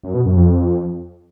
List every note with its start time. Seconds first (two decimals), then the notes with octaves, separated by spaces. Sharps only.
0.03 F#2
0.14 B2
0.25 F#2
0.36 F2